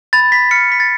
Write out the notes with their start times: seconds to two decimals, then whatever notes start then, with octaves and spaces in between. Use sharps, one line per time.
0.13 B5 A6
0.32 B5 B6
0.51 F6 C#7
0.70 B5 B6
0.80 A6